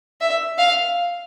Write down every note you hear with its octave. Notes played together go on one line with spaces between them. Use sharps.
E5
F5